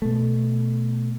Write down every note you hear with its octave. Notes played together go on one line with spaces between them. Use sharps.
B2 A3